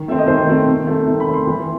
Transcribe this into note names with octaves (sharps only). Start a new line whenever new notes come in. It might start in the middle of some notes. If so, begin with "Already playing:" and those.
Already playing: D#3
A3 C4 E5
D#5
D#3 C5
A3 C4
D#3
A3 C4
D#3 E5
B5
A3 C4
C6
E3